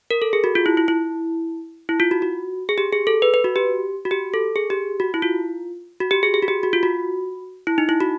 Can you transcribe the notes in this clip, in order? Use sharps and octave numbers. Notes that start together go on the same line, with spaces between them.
A#4
A4
G#4
F#4
F4
E4
E4
E4
E4
F4
F#4
F#4
G#4
G4
G#4
A4
B4
B4
F#4
G4
F#4
G4
A4
G#4
G4
F#4
E4
F4
F#4
G4
G#4
G#4
F#4
G4
F#4
F4
F#4
E4
D#4
E4
F#4